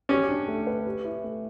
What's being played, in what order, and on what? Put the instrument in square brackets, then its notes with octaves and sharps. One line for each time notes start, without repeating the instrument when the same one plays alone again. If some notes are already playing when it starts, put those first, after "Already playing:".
[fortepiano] C#4 [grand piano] G4
[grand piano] D4
A3
B4
G4
E4
A3